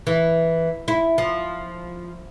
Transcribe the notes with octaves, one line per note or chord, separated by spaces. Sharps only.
E3
E4
F3